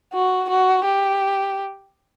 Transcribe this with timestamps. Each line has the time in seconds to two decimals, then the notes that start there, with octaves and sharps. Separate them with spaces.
0.13 F#4
0.50 F#4
0.85 G4